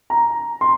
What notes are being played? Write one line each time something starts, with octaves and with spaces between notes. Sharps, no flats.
A#5
C6